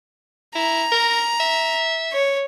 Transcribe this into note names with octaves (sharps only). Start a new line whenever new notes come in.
E4 A#5
A#4
E5
C#5